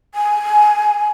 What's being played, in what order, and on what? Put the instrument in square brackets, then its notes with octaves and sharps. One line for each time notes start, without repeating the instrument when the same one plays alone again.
[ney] G#5